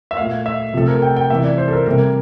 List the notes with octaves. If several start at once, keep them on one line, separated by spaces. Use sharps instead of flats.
E5
A#2 A3 F5
E5
C3 F3 A3 A4
A#4
G5
G5
C3 E3 A#3 E5
D5
C5
A4
A#4
C3 G3 A#3 A#4